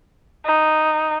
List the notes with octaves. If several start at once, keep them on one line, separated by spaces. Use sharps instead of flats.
D#4